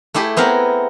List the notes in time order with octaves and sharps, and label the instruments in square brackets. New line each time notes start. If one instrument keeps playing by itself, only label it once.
[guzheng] A3 E4 G4 G#4
B3 C4 G#4 A#4